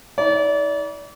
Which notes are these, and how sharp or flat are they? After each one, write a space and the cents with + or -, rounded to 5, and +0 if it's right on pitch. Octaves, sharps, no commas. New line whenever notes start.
D#4 +45 D5 -35